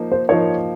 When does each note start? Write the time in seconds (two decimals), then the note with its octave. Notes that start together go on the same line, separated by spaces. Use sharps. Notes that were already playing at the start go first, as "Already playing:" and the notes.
Already playing: F3 A#3 D#4
0.12 C5
0.29 F3 A#3 D#4 C#5